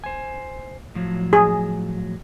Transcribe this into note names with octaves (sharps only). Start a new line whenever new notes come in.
C5 G#5
A2 F3 F#3
G#4